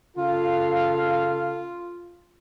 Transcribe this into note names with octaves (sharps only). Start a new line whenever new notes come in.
C#3 F4 A4 F5